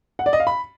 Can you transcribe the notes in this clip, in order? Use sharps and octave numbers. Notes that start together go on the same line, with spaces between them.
F#5
D5
D#5
F5
B5